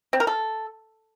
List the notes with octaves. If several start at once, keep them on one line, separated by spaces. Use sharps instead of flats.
C4
A#4
A4